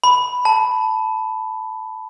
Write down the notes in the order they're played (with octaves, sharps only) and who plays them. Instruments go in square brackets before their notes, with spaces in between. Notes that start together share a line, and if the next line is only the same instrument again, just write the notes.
[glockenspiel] B5
A5